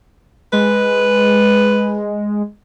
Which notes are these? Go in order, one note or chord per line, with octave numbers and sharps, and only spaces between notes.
G#3 B4